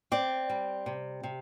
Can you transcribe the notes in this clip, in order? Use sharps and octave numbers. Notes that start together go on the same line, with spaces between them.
C4 D5
G3
C3
C3